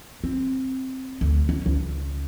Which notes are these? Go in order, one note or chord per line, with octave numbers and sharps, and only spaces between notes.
C4
D2
C#4
C#2